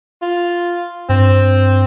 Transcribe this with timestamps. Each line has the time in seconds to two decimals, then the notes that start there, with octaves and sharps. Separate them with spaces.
0.22 F4
1.09 G2 C4